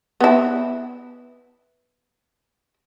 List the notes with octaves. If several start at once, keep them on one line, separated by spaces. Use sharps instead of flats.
B3 E4